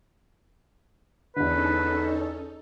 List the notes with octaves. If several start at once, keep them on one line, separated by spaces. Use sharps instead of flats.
E2 D3 C#4 D#4 A4 B4